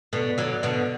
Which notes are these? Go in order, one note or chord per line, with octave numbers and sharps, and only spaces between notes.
B2 D3
D3 F#3
B2 D3